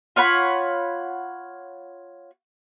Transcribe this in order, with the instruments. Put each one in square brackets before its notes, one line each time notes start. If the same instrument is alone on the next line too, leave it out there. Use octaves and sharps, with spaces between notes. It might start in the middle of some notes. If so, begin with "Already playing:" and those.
[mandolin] F4 C#5 F#5 B5